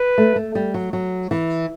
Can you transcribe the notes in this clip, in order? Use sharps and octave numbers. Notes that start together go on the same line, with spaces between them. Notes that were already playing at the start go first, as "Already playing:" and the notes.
Already playing: B4
A3
A3
G3
F#3
F#3
E3